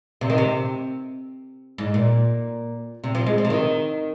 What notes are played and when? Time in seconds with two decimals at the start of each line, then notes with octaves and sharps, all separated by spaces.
0.21 C3
0.30 D#3
0.38 C3
1.78 G#2
1.94 A#2
3.04 C3
3.15 F3
3.26 G#3
3.38 F3
3.45 C3
3.50 D#3